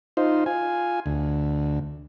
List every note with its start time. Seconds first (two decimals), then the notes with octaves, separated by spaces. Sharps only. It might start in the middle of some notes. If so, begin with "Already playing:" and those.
0.17 D#4 F4 C5
0.46 F4 G#5
1.06 D2